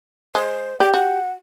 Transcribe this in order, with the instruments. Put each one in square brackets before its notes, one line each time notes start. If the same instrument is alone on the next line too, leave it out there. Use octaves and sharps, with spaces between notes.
[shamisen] G#3 [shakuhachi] C5
[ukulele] G4 [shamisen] D5 [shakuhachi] G5
[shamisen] F#4 [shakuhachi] F#5